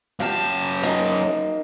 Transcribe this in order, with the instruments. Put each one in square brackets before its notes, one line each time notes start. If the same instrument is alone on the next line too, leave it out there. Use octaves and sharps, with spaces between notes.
[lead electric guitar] F#2 A5 [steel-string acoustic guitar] G4 F5
[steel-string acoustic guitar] A#3 D#4